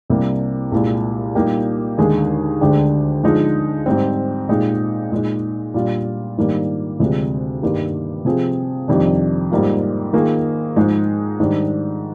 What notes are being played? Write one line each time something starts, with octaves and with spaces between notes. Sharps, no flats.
C2 C3 G3 A#3 D4
C2 A#2 G#3
A#2 G3 A#3 D#4 G4
D#2 D3 G#3 D#4 G#4
D2 D3 G#3 D4 G4
D3 F3 G#3 D#4
G#2 G3 C4
A#2 G#3 D#4 G4
A#2 G#3 D#4
A#2 G3 D4 F4
G#2 D#3 G3 A#3 D4
D2 C3 F3 G#3 D4
G2 D#3 G3 A#3
C3 F3 C4 F4 G#4
F2 C3 D#3 G3 D4
G#2 G3 A#3 F4
D#3 A#3 F4 G#4
G#2 F3 G#3 D#4 G#4
G#2 D#3 G3 D4